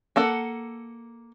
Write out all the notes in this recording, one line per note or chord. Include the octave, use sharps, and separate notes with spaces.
A#3 A4 F#5